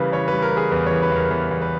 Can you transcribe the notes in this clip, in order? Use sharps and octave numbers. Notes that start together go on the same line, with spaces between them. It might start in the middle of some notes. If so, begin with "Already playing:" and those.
Already playing: C#3 E3 G3 A#4 B4
E3 C#5
G3 B4
A#4
E3 G#4
E2 B4
E3 C#5
B4
E2 A#4
E2 B4
E2
B4